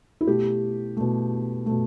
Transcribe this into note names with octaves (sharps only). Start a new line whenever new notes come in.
E4
B2 A3 G4
B2 A3
B2 A3